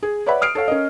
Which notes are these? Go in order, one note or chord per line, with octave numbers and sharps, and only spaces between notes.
G#4
B4 C#5 D5 E5 F#5 B5
D#6 F6 C7 D7
A4 C#5 F5
C#4 A#4 D#5